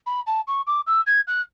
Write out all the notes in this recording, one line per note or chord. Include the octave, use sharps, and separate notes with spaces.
B5
A5
C#6
D6
E6
G#6
F#6